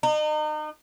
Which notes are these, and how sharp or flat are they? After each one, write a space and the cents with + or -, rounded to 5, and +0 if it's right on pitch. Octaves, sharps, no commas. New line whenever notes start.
D#4 -35